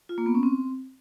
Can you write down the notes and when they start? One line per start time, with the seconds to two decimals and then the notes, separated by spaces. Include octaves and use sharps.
0.09 F4
0.18 A#3
0.26 B3
0.35 C#4
0.43 C4